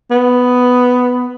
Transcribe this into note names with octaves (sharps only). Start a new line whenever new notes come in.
B3